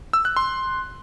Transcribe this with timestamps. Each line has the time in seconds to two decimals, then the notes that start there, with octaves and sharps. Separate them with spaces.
0.13 E6
0.25 F#6
0.37 C6